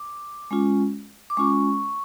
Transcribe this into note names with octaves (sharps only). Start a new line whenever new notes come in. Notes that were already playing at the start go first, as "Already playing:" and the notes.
Already playing: D6
G#3 C#4 F4
D6
G#3 C#4 F4 C#6